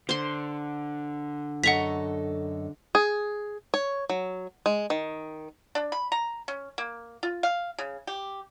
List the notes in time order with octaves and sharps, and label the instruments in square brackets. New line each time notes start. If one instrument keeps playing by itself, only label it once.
[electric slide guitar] D3 [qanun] C5 C6
[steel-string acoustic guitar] F#2 A4 D#5 [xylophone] F#5 B6 [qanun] A#5 C#6
[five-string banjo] G#4
C#5
F#3
G#3
D#3
[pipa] D4
B5
A#5
C#4
A#3
F4
F5
C#3
G4